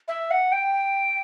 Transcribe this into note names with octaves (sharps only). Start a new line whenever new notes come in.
E5
F#5
G5